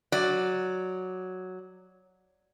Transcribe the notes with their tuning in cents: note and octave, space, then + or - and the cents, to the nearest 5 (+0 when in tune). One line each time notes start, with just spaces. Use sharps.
F#3 +0 D5 +5